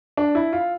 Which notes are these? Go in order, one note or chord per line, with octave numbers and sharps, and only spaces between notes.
D4
E4
F4